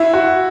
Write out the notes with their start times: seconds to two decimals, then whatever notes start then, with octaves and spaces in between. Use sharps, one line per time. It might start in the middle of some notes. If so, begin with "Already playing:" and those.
Already playing: E4
0.13 F#4